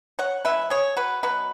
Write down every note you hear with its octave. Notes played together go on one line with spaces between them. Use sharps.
C#5 F#5
E3 G#3 C#4 B4 E5
G#4 C#5
F#4 B4
B2 F#3 C#4 F#4 B4